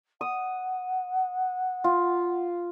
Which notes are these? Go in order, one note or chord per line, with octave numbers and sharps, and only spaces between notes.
F#5 D#6
F4